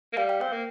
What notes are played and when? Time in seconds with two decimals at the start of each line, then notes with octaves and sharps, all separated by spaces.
0.13 A#3
0.17 G3 F5
0.29 G5
0.41 C4 G5
0.53 A#3